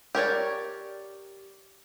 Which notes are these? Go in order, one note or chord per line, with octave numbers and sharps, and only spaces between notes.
G4 A#4 C#5 D5